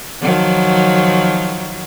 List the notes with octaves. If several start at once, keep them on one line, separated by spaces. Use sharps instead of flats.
D#3 F3 F#3